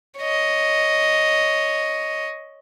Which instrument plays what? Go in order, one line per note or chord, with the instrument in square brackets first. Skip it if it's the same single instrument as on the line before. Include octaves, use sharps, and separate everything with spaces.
[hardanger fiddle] C#5 D#5